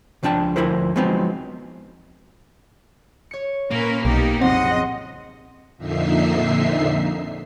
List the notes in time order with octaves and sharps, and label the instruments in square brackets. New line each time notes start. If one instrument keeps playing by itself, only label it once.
[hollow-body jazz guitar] C#2 F3 D4 G5 A5
D2 F3 E4 A#4 C5
F3 F#3 G#3 B3 C4 D#4
[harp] C#5 C#7
[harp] A#2 [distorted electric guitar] A#3 [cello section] C#4 A#4 B4
[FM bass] B1 [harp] G3 [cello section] B3 D#4 G4
[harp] F#1 C6 F#6 [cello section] F3 D#5 [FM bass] C4 [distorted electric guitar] F#5
[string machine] F2 A#2 D3 D#4 E5 C7